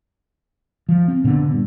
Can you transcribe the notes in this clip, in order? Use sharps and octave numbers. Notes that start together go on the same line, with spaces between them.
F3
C4
A#2 D3 B3
G2